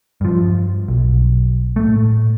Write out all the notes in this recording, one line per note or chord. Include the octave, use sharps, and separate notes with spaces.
G2 F3
B1
A2 A3